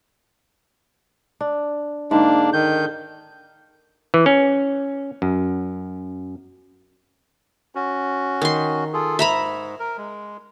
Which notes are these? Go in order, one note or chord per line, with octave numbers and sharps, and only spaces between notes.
D4
G#2 D3 A#3 D4
D#3 G6
E3
C#4
F#2
C#4 F#4
D#3 C6
F4 G#4 A4
G#2 E5 A#5 B5
A#4
G#3